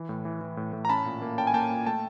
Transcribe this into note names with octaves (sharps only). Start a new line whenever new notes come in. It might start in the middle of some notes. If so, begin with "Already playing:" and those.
Already playing: E3
A2
E3
E3
A2
A2
A#5
C#4 A5 B5
A#2
A#3
C#4 G5 A5
G#5
A#3 G5 A5
A#2
A3 G5 A5